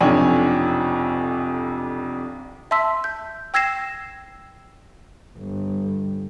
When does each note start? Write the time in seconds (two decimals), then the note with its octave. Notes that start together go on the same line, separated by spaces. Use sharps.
0.01 B1 F2 C3 D4 C#5 G#5
2.71 E5 A5 C6 E6 B6
3.04 G6
3.54 G5 E6 G#6 A#6 C7 E7
5.38 G1